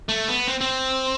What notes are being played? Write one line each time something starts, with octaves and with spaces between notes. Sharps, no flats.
A3
B3
C4
C4